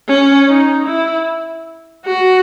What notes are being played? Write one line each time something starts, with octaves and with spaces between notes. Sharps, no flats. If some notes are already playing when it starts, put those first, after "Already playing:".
C#4
D#4
E4
F#4